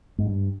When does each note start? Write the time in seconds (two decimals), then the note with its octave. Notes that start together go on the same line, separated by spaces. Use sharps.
0.18 G#2
0.26 G2